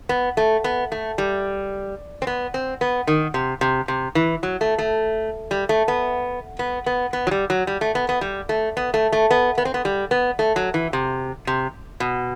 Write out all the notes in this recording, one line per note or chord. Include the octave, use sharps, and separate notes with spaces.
B3
A3
B3
A3
G3
C4
B3
C4
B3
D#3
C3
C3
C3
E3
F#3
A3
A3
G3
A3
B3
B3
B3
B3
F#3
G3
F#3
G3
A3
B3
B3
G3
A3
B3
A3
A3
B3
B3
C4
B3
G3
B3
A3
F#3
E3
C3
C3
B2